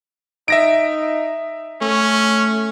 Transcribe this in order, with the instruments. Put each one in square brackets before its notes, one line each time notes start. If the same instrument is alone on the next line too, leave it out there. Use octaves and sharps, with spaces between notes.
[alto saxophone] D#4 [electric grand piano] E5 A#6 D7
[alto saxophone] A3 [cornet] C#4